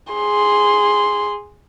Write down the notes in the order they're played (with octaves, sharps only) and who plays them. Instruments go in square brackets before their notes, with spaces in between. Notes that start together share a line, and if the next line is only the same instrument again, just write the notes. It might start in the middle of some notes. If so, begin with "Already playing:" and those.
[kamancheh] G#4 C6